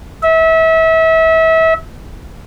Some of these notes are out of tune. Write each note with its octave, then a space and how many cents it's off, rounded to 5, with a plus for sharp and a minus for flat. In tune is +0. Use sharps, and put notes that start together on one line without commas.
E5 -30